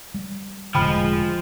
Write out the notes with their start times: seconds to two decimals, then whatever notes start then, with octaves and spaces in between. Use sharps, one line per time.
0.14 G3
0.75 E1 A2 D3 F3 G#3 G5 B5 F6